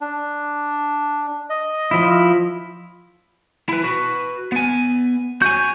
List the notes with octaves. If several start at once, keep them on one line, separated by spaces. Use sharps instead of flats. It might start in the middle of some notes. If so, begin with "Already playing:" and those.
D4
D#5
F3 E4
E4 B4
F#4 B4
B3 G#5
F#4 G#5 G6